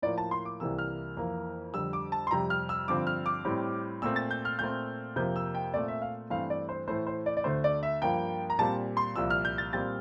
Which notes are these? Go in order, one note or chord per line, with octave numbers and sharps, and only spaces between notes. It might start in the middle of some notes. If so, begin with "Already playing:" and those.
A2 F3 A#3 D5
A5
C6
D6
C2 C3 E3 A#3 E6
F6
F2 E3 A#3
F2 D3 G3 E6
D6
A5
C6
F2 C3 G3 A#5
F6
E6
G2 D3 F3 C4 D6
F6
D6
A2 G3 C4
A#2 A3 C4 E6
A6
G6
F6
A#2 A3 C4 G6
F2 C3 F3 A#3 G6
E6
G5
A#2 A3 C4 D5
E5
F5
G2 E3 A3 C4 F5
D5
C5
A2 E3 A3 C5
C5
D5
D5
D2 D3 A3 C5
D5
E5
G2 F3 A#3 G5
A#5
A#2 G3 C4 A5
C6
C2 A#2 F3 E6
F6
G6
A6
A#2 G3 C4 A6